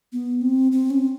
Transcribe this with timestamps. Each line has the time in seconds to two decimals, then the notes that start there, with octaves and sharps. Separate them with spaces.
0.13 B3
0.41 C4
0.72 C4
0.90 C#4